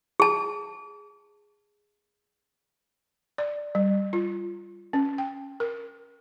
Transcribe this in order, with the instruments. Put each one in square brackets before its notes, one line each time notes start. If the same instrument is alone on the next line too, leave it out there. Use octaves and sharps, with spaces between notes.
[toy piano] G#4 A5
[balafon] D5
G3
F4
C#4
G5
A#4